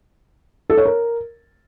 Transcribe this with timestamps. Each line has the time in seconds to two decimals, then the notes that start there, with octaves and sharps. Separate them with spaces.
0.70 A4
0.77 C#5
0.85 A#4